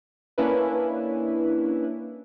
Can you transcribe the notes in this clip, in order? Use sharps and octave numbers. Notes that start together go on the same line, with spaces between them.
A#3 C#4 D4 E4 B4